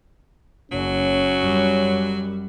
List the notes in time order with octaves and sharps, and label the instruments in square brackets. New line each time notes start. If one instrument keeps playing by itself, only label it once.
[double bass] F#1 [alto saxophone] F#3 [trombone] C#4
[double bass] F#2 G3